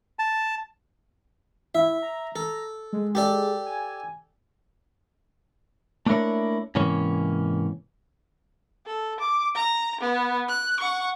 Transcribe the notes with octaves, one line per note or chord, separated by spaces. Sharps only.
A5
E4 E5
A#5
A4
G#3
G4 A4 D5
G#5
A3 A#3 D4 E4 A#4 C#5
G#2 C3 E3 A#3 C#4 C#5
A4
D6
A#5
B3
F#6
F#5 C#6